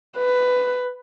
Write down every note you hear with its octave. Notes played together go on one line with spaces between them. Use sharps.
B4